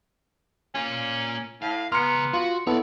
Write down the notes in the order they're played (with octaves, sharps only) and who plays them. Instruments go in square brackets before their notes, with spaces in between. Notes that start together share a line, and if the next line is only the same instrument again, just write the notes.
[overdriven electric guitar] A#3 F4 [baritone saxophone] C#4
[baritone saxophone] A2 [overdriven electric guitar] F5
[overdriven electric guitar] C#2 A#5 [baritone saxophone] B3 [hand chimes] C6 C#7 [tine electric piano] F6
[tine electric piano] F4 [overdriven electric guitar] F#4
[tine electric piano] B3 E4 A4 [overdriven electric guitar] C#5 D5